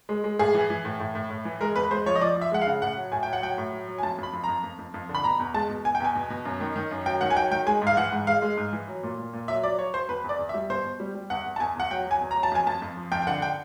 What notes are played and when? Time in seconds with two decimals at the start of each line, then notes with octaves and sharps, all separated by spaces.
0.09 G#3
0.24 G#3
0.39 A2 G#4
0.54 E3
0.70 E3
0.85 A2
1.00 A2
1.15 A2
1.30 A2
1.45 E3
1.61 G#3 A#4
1.76 E2 B4
1.91 G#3 C5
2.06 F3 C#5
2.16 D#5
2.21 F3 D5
2.36 F3
2.41 E5
2.52 G#3 F#5
2.62 F5
2.67 C#3
2.82 A2 F#5
2.97 F#3
3.12 A2 G#5
3.23 F#3 G5
3.33 F#5
3.43 F#3 G5
3.58 A2
3.73 F#3
3.88 F#3
3.98 G#5
4.03 F2 A5
4.18 F2 B5
4.33 F2
4.44 F2 A#5
4.64 F2
4.79 F2
4.94 F2
5.09 D3
5.15 B5
5.24 B2 A#5
5.39 E2
5.54 G#3 A5
5.70 B2
5.85 B2 G#5
5.95 G5
6.00 E2 G#5
6.15 B2
6.30 B2
6.45 F#2
6.60 D#3
6.76 D#3
6.91 F#2
7.06 F#3 G5
7.21 D#3 F#5
7.30 G#5
7.36 F#3 G5
7.51 D#3 G5
7.66 G#3 G#5
7.82 G#2
7.87 F5
7.97 E3 F#5
8.12 G#2
8.27 G#3 F5
8.42 G#3
8.57 G#2
8.73 E3
8.88 F#3
9.03 A#2
9.18 A#2
9.33 A#2
9.48 F#3 E5
9.63 F#3 D5
9.79 F#3 C#5
9.94 F#3 C5
10.09 E2 B4
10.24 E2
10.29 D5
10.39 E2
10.49 E5
10.54 G3
10.70 B2 C5
10.85 B2
11.00 G3
11.15 G3
11.30 E2 F#5
11.45 E2
11.56 A5
11.60 E2 G#5
11.75 E2 F#5
11.91 F#3 G5
12.06 F#3
12.11 G#5
12.21 E2
12.31 A#5
12.36 F#3
12.43 A5
12.51 F2 G#5
12.67 F2 A5
12.82 F2
12.97 F3
13.12 F2 G5
13.22 G5
13.27 D3 F#5
13.42 G5